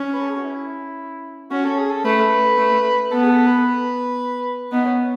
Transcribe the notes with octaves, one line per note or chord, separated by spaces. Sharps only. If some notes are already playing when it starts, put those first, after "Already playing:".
Already playing: C#4
B4
A4
G#4
F#4
E4
C#4 F#4
A4
G#4
A4
A3 B4
A3
B3 A4
G#4
A4
B4
B3 D#4
C#4